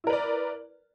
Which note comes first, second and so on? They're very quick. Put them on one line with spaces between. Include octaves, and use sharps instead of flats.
E4 A#4 B4 D5